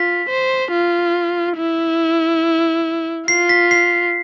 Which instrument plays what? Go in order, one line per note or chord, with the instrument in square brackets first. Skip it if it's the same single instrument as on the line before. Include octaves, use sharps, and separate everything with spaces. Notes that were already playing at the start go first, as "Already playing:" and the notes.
Already playing: [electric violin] F4 [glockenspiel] B6
[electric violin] C5
F4
E4
[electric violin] F4 [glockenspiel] C7
[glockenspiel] B6
C7